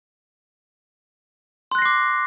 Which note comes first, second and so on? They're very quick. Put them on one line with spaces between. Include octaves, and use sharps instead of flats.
C6 F#6 A#6 C7 D6